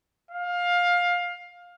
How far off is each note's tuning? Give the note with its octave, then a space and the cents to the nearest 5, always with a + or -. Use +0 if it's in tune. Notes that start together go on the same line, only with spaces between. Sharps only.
F5 +20